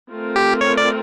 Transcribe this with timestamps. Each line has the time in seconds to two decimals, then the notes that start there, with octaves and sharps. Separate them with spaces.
0.11 A3 C4 F4 A#4
0.36 G4
0.61 C#5
0.78 D5